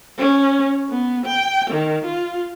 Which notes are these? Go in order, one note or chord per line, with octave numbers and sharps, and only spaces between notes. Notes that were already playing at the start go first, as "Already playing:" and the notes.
C#4
B3
G5
D#3
F4